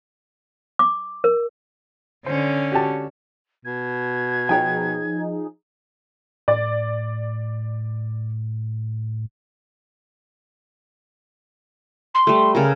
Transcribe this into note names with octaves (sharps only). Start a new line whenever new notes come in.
D6
A#4
D3 C#4 C5
F#4 G4 A5
B2 G#6
F3 D#4 G#4 C#5 G5 G#5
A2 D5
C6
G3 A3
C#3 A4 A#4